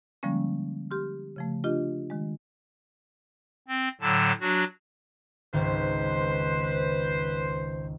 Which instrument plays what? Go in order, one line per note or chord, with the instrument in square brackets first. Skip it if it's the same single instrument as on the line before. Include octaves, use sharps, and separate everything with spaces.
[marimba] D3 F3 G3 G#3 A#3 C#4
G4 C6 F6
C#3 F3 A3
D4 F4 G4 D#5
D#3 G#3
[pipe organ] C4
A2 D3 F#3 A5
F#3 D4 F#4
[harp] G#1 C#2 [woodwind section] B4 C5